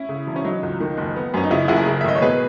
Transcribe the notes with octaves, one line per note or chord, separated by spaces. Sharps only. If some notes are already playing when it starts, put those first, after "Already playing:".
Already playing: C#4 E4
C#3
E1
C#4
F#3 D#4
C#2
D#3
F#1
B3
F#2 C#4
D#4
C#3 C#4 E4
F#1 E4 G#4
C#3
E5
G#1 D#5
C#5
B2 G#4 B4